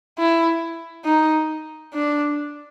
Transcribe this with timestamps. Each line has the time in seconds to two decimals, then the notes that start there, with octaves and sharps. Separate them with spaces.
0.18 E4
1.05 D#4
1.93 D4